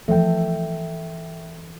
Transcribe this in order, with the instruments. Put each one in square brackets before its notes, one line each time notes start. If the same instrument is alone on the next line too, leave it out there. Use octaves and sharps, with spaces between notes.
[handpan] E3 A4 [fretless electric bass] F3 A3 [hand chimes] E5 G5